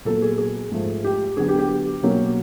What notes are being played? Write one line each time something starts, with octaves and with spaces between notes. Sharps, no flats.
A#2 F#3 B3 A4
G#4
G#4
G#2 F3 A3
G4
D3 F#3 B3 G#4
G4
G4
B2 F#3 A#3 C#4